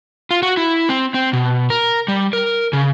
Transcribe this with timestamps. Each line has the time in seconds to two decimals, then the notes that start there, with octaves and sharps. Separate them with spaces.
0.31 F4
0.43 F#4
0.57 E4
0.89 C4
1.14 C4
1.33 B2
1.70 A#4
2.08 G3
2.33 A#4
2.73 C#3